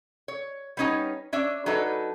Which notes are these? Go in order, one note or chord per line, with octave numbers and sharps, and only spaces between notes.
C#5
G3 B3 C#4 D#4 C#5 G#5
C#4 D4 D5 E5
F#3 D4 D#4 A4 B4